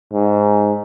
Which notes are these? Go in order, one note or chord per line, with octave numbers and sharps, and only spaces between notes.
G#2